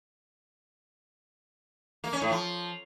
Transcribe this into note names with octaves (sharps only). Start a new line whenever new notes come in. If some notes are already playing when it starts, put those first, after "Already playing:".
A#3
C#4
A2
F3